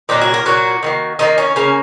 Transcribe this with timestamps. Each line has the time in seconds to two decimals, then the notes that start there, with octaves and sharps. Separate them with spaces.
0.09 A#2 F#3 A#3 D#4
0.21 F#4
0.34 A#4
0.46 A#2 F#3 A#3 F#4
0.83 D#3 F#3 A#3
1.19 D#3 F#3 A#3 D#4
1.38 C#4
1.56 C#3 A#3 C#4